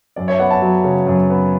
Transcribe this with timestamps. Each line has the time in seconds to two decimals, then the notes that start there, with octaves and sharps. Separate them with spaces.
0.16 F#2 D5
0.28 C#5 E5
0.39 B3 D5 F#5
0.51 F#5 A5
0.62 F#3
0.84 C#3
1.07 F#2
1.30 B3